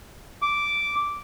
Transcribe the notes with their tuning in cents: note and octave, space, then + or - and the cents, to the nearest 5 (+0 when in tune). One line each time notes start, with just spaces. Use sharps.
D6 -10